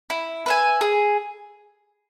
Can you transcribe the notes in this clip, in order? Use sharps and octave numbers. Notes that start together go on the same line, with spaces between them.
E4
B4 E5 G#5
G#4